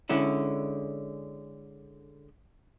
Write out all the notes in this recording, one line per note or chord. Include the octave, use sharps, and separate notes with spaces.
D3 G#3 C#4 E4